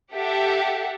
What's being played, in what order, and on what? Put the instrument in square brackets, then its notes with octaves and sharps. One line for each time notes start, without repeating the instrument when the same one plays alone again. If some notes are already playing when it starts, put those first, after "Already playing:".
[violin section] G4 A4 E5 F#5